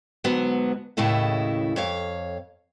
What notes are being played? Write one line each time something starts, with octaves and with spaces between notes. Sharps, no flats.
G#2 D3 F#3 B3 F#4
D#2 A2 C#3 E4 A4 D#5
F2 C#5 F5